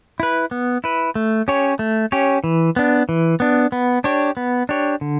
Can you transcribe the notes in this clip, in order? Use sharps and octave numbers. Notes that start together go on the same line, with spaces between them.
E4 B4
B3
E4 B4
A3
C#4 G4 C#5
A3
C#4 G4 C#5
E3
B3 D4
E3
B3 D4
B3
D4 G4 C#5
B3
D4 G4 C#5
D3